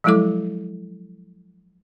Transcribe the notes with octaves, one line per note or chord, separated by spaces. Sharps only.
F3 F#3 G#3 E4 A4 D6